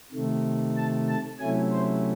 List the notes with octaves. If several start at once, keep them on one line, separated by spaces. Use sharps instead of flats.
C3 D#3 A3
A5
A5
C3 F#3 A3 C#4 E4 G#5
C5